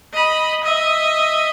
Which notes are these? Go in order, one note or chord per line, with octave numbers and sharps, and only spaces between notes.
D#5 B5
D#5 E5